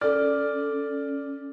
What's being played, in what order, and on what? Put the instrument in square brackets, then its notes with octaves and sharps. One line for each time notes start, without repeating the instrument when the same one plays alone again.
[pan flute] C#4 [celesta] A4 F6 [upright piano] D5